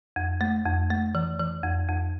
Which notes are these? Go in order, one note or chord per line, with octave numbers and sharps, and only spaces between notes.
F2
A3
F2
A3
E3
E3
F2
F2